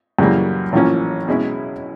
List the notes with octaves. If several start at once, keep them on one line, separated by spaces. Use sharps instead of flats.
F#2 C#3 E3 G3 A#3
A1 A2 F3 A#3 C#4
B2 G#3 C#4 E4